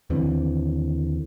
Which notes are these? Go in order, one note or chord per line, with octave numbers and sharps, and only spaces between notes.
D#2 D3 E3 C4